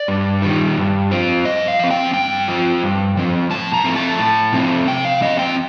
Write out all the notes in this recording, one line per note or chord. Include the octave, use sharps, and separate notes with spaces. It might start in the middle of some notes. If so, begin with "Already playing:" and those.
Already playing: D5
G2
D#3 G3
G2
F3 C4
G2 D#5
F5
F3 C4
G5
G2 G5
F3 C4
G2
F3 C4
A2 A5
A#5
F3 A3 C4
A5
A2
F3 A3 C4
C3 G5
F5
F3 C4 D#5
G5